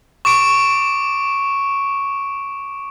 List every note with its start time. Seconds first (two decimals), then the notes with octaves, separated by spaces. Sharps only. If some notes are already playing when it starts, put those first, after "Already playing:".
0.25 C#6 D6 D7